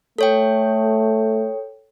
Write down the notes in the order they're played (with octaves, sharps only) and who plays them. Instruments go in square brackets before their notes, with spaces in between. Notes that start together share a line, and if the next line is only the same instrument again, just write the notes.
[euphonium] A3 [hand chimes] A4 C#5 G5